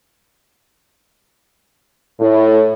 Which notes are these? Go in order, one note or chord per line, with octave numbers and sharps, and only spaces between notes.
A2